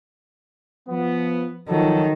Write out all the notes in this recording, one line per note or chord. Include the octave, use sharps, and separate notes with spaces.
F3 B3
D#3 F3 F#3 A4